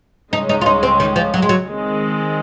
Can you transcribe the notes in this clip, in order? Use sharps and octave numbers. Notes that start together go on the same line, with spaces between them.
C#2 C#3 G#3 C#4 D#4
D#4
F4
D#4
C4
D#3
F3
F#3
G#3
F#3
D#3 G#3 C4